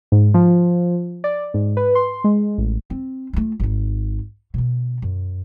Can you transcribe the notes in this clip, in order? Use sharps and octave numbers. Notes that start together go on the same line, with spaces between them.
G#2
F3
D5
G#2
B4
C6
G#3
A1
C4
A3 F4
G#1 D#4
B2 D3
F#2